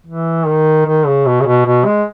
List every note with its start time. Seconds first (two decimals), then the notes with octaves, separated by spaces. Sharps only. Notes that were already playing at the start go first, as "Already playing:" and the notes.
0.06 E3
0.46 D#3
0.86 D#3
1.06 C#3
1.26 B2
1.40 C#3
1.46 B2
1.66 B2
1.85 G#3